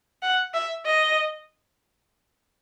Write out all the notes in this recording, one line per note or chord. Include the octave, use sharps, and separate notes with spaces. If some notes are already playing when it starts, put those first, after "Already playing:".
F#5
E5
D#5